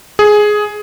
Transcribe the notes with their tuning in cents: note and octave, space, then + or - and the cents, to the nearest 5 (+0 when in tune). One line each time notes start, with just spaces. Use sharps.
G#4 +10